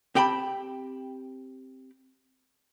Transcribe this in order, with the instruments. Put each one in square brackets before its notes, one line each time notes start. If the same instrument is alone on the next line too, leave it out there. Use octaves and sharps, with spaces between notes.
[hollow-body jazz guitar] C4 G4 G5 A5 B5